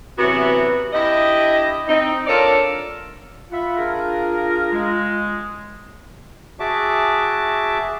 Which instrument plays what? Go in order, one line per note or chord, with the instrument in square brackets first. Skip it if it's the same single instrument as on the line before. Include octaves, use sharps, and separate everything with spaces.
[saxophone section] C3 E3 F#3 B3 F#4
D4 E4 G4 D#5
C4 D#4
D4 F4 A4 A#4 C#5 D5
[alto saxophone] F4 [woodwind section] E5 F#5 B5
[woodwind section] D4 G#4 A#4
G#3
[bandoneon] F#4 G#4 E5 A5 D6